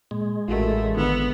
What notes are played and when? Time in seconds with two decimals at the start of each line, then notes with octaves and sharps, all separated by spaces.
0.11 A#2 G#3
0.48 A1 A3 F4 F#4 A#4
0.97 G#1 D3 B3 F4 E6